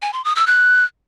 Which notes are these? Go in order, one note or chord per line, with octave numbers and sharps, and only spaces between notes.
G#5
C6
D#6
E6
F#6